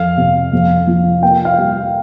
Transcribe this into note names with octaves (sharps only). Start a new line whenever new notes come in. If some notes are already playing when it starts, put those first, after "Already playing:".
Already playing: F2 F5
C3
F2
F3
A#3 G5
F5
G3